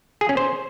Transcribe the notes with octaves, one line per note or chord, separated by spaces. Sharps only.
G#4
C#4
C5